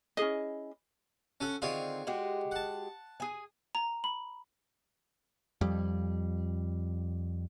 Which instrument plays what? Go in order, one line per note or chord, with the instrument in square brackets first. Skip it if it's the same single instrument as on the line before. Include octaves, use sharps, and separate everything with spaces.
[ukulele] C#4 E4 G#4 D#5
[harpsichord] C#4 A4 F#5
[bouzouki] D3 D#3 C4 [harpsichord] F4 G#4 C#5
[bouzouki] G#3 F#4 G4
[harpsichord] F#5 A5
[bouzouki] G#4 G#5
[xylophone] A#5
B5
[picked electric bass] F2 G3